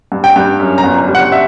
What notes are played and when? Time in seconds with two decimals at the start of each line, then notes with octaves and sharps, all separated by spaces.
0.12 G2
0.24 G5
0.36 G2
0.60 F#2
0.78 A#5
0.83 G1
1.08 G3
1.15 F#5
1.32 E5